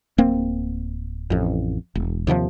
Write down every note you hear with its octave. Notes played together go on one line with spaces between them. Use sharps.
D1 A#3 C4
A1 F2
E1
D#2 C3 D#3 F3